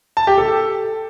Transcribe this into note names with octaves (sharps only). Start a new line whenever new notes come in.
A5
G4
A4